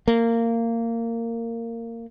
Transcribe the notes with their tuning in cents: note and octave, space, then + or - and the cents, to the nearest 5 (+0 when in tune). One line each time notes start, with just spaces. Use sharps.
A#3 -20